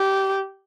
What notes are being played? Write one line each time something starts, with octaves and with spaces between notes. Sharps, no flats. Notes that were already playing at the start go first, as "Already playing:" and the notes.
Already playing: G4